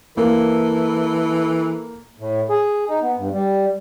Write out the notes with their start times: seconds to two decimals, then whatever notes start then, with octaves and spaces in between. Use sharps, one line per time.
0.17 E3 A#3 A4
2.20 A2
2.50 G#4
2.89 D#4
3.03 B3
3.17 G2
3.33 G3